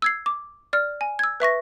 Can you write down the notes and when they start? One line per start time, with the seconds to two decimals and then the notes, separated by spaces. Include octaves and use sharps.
0.02 E6 G#6 C7
0.26 D6
0.73 D5 F6
1.01 G#5
1.19 E6 G#6
1.40 B4 E5 C#6 A#6